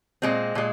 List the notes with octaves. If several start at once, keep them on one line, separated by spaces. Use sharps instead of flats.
A#2 G#3 C4
A#2 G#3